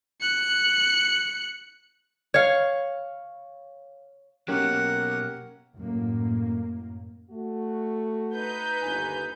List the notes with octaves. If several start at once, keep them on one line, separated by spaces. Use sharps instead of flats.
F#6 C#7
C#5 F5
B2 F#3 A#3 C#4 G4 A#4 F#5
F#2 A2 A#3
A3 F#4
D#4 B4 G6
G1 D#2 G#5